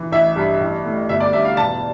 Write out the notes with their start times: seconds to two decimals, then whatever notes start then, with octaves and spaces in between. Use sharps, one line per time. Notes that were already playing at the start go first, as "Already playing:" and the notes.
Already playing: E3
0.12 A1 E5
0.36 G2
0.60 A1
0.85 A2
1.09 G1 E5
1.20 D5
1.33 G2 E5
1.45 F5
1.57 E1 A5